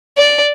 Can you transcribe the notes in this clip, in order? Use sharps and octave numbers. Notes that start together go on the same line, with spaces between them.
D5